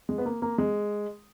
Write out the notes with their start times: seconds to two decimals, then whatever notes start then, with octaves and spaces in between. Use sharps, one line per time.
0.09 G#3
0.18 B3
0.25 A#3
0.42 A#3
0.58 G#3